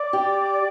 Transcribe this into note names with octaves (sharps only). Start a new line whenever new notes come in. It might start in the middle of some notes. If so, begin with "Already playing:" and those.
Already playing: D5 D6
G4